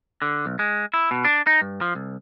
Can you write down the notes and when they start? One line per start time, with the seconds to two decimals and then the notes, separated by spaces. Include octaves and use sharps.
0.22 D3
0.46 B1
0.59 G#3
0.94 E4
1.11 B2
1.25 D4
1.47 D#4
1.61 G2
1.81 F3
1.95 C2